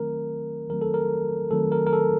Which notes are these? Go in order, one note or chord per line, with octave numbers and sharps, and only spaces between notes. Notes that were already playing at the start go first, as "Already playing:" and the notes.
Already playing: D#3 F#3 A3 C4 A#4
D#3 F#3 A3 C4 A#4
A4
A#4
D#3 F#3 A3 C4 A4
A#4
A#4
A4